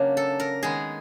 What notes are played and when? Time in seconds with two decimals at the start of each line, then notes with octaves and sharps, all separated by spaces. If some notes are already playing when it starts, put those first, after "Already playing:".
Already playing: C#3 F#3 A#3 D4
0.17 A4
0.40 A#4
0.63 D#3 G#3 B3 G#4